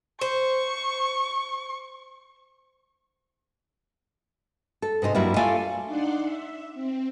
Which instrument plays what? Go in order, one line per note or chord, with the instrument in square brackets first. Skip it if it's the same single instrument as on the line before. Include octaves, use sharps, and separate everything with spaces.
[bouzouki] C5 [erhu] C#6
[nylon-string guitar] A4
G#2 C3 D#4 C5
G2 F#3 G3 A#3 E4
A3 F4 A4 D5 F5 G#5
[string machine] D4 D#4 D5 F#5 C6
E5
C4